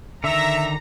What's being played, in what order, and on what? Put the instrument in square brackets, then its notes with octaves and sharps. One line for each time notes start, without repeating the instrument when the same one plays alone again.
[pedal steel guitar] D3 D#3 [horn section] E5 [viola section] A#5